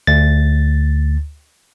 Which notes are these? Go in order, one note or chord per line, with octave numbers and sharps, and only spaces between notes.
D2 A6